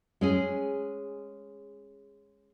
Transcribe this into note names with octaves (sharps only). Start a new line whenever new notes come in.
G#3 C#4 G#4